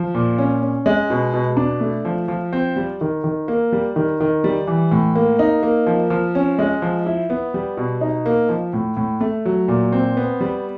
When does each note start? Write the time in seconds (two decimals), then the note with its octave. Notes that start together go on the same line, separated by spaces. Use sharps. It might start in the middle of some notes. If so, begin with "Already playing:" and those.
Already playing: F3
0.15 A#2
0.38 C#4
0.62 C#4
0.86 G#3
1.10 B2
1.34 B2
1.57 D4
1.80 A3
2.05 F3
2.28 F3
2.53 C4
2.76 G3
3.01 D#3
3.24 D#3
3.48 A#3
3.72 G3
3.96 D#3
4.20 D#3
4.44 G3
4.67 E3
4.91 A2
5.15 A#3
5.39 D#4
5.63 A#3
5.87 F3
6.10 F3
6.35 C#4
6.59 G#3
6.82 F3
7.06 E4
7.30 B3
7.54 G3
7.77 B2
8.01 D#4
8.26 A#3
8.49 F3
8.73 A2
8.97 A2
9.21 A3
9.45 F#3
9.68 A#2
9.92 C4
10.17 B3
10.41 G3